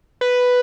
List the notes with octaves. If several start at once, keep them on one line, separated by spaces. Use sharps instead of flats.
B4